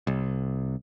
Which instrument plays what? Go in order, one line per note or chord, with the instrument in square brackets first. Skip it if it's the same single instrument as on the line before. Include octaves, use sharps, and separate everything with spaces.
[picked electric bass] C2